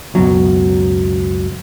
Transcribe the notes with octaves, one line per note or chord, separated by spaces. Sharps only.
C#2 F#2 B2 F#3